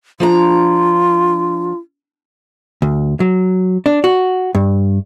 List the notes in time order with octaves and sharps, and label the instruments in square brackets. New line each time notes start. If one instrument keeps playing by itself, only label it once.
[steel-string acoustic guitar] F3 D4 A#5 [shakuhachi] F4
[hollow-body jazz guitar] D2
F#3
D4
F#4
G2